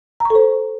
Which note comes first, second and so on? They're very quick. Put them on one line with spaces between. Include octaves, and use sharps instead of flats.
A#5 C#6 A4 C5